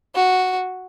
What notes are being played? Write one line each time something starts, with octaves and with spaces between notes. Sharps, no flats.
F#4